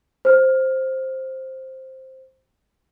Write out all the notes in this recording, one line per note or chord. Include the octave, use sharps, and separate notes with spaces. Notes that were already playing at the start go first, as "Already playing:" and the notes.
C5 F6